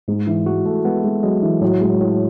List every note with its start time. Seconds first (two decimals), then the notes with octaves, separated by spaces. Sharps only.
0.08 G#2 G#3
0.27 E3
0.46 G#3 F#4
0.65 A3
0.85 G#3 B3
1.04 G#3
1.23 F#3 G#3
1.42 E3
1.61 A2 F#3
1.81 G#3
2.00 A2